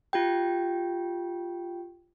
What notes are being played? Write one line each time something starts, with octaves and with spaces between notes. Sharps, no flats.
F4 G4 G5